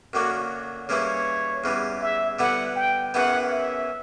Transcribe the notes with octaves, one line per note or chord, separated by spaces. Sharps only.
F#2 D3 F#3 A#3 D4 F#4
C#3 E3 G3 A#3 E4 C#5
E2 C#3 E3 G3
E5
D3 G3 B3 E4 F#5
G5
F#2 C#3 E3 B3 E4 F#5
E5